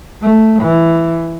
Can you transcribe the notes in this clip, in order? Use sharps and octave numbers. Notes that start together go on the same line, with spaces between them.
A3
E3